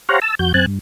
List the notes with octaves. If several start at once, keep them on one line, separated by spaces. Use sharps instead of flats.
G4 C5 C#5 F5 F#5 A#5
A5 E6
F2 F#4 G6
F#2 C4 G#5 A5 F#6
G2